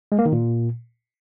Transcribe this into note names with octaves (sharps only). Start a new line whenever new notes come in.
G#3
A#3
D#3
A#2